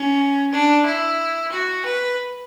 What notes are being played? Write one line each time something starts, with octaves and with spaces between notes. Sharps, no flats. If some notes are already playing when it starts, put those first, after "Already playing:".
Already playing: C#4
D4
E4
F#4
B4